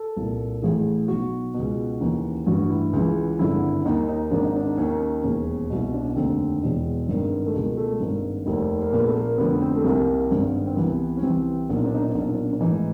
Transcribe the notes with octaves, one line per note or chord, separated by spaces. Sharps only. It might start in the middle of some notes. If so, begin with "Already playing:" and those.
Already playing: A4
C2 A#2
A1 A2 E3 G#4
B1 B2 F#4
B2
C#2
D#2 C#3 E3
A1 G2 E3 F#4
E4
C#2 C#3 E3
G#1 G2 D3 E4
D#2 D#3 D#4
D#4
G#1 G#2 D#3 D4
D#4
D4
D#2 D#3 C#4
C#4
E1 D#2 C#3 C#4
C2 B2
D4
C#4
F1 D#2 D3 C4
E1 E2 B2
G#1 G2 D#3
A3
C#2 B2 A#3
A3
G#1 G2 D#3 A#3
F1 D#2 D#3
A#3
A#1 A#2 B3
A3
A#3
F1 F2 D3 B3
C#4
C4
A3
C2 C3 D#3 A#3
G#1 G2 D#3
C4
C2 C3 E3 B3
C#4
C2 C3 E3 C4
B1 A#2 D4
D#4
D4
D#4
D4
D#4
B1 A#2 D4
D#4
D4
D4
A1 G#2 E3 D#4